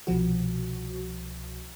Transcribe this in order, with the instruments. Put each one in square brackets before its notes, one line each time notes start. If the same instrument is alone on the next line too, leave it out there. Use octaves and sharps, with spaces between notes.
[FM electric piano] C2 B2 F3 F#4